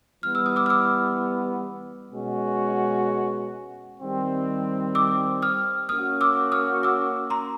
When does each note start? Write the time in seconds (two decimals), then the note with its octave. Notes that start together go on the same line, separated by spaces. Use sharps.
0.23 E3 G3 B3 F6
0.35 E6
0.46 D#6
0.56 D6 E6
0.66 F6
0.70 D6 E6
2.12 B2 G#3 C#4 F#4
4.00 D#3 G3 C4
4.95 D6 E6
5.42 D#6 F6
5.89 A#3 C#4 F#4 D#6 F6
6.21 D6 E6
6.52 D#6 F6
6.83 D6 E6
7.30 A#5 C6